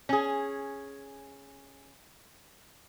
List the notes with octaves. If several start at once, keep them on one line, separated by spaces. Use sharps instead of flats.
C#4 G#4